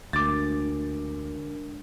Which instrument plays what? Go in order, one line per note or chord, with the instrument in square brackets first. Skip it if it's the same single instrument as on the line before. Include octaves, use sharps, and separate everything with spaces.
[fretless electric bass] D2 [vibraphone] G#3 D4 A#4 [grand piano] D6 A6